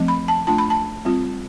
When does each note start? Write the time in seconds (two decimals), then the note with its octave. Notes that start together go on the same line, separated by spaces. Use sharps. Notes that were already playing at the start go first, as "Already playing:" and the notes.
Already playing: F3 A3 C4
0.08 B5
0.28 A5
0.47 A3 D4 F4 A5
0.58 B5
0.70 A5
1.05 G3 C4 F4